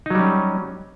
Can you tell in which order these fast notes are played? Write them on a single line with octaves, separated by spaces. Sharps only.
D#4 F#3 G3 C#4